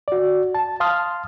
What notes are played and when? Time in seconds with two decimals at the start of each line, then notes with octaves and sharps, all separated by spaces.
0.08 F#4 D5
0.55 A5
0.80 F5 A5 C6 D#6 F6